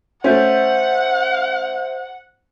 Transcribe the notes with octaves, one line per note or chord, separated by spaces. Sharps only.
A3 C#4 C5 E5 F#5 G6